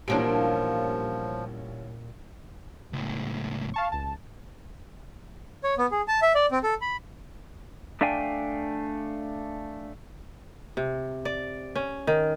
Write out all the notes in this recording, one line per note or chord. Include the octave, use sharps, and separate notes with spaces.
A1 A#2 F3 G3 A#3 C#4 D4 D7
C#2 A2
F5 A5 C#6
C#2 A5
C#5
B3
G#4
A5
E5
D5
C4
A4
B5
A3 D4 D5 F5 G5 G#5
C3
D5
C#4
D#3